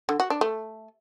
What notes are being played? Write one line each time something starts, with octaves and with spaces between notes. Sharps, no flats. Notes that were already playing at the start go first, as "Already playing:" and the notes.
D3
F#4
D4
A3